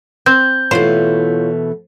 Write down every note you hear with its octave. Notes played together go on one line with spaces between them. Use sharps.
C4 G6
B2 E3 A3 E4 F4 C5 C#5